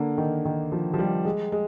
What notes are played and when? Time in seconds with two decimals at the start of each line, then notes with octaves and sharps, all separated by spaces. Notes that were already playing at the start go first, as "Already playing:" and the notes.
Already playing: D3 A#3
0.18 D#3
0.45 D#3
0.72 F3
0.94 F3
0.99 G3
1.25 G#3
1.52 G#3